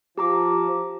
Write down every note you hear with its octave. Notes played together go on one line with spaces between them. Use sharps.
F3 G4 A#5 D6